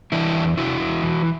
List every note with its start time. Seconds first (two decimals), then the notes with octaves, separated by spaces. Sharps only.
0.12 E3 D4 E4
0.35 E2
0.57 C3 E4 F#4
0.80 E2
1.03 E3